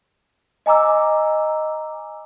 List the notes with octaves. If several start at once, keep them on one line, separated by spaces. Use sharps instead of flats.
D#5 G#5 A#5 D6 E6